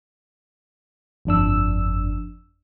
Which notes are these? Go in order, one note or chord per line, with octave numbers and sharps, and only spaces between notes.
G1 F2 D4 E6